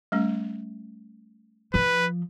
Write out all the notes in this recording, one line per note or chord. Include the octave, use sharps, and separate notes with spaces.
G3 A3 C#4
F3 B4